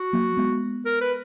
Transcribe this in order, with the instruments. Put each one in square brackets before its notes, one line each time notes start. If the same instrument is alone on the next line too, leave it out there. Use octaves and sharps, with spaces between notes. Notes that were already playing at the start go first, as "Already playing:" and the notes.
Already playing: [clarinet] F#4
[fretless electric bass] F#3 A#3
G#3 B3
[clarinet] A#4
B4